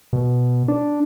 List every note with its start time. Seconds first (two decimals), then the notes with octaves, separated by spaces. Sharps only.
0.13 B2
0.68 D4